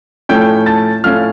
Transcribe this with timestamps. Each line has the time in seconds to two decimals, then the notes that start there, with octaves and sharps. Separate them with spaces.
0.29 A2 F3 A3 C#4 G5 G6
0.66 A5 A6
1.04 A2 F3 A3 C#4 F5 F6